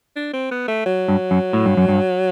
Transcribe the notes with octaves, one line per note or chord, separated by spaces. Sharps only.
D4
C4
B3
A3
F#3
G2
F#2
A2
G2
F#2
G2